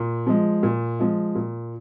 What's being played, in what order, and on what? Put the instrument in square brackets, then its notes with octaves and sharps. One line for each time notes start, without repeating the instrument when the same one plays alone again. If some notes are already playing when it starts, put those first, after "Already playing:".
Already playing: [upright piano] A#2
F3 G#3
A#2
F3 G#3
A#2